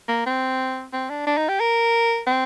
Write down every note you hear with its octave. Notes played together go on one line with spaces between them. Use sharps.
A#3
C4
C4
D4
D4
D#4
G4
A#4
C4